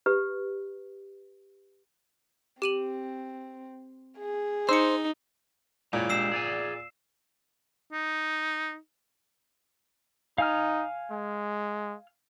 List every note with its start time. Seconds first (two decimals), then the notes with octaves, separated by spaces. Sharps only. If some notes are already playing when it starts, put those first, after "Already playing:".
0.06 G4 B4
2.62 C4 G4 D#7 F#7
4.18 G#4
4.69 D#4 C5 E6 C#7
5.93 A#2 G#3 E4 C#5
6.10 G#3 D4 G4 E6 C7 E7
6.32 G#4 D5 G#5
7.92 D#4
10.38 D#4 F5 G#5 F6
11.11 G#3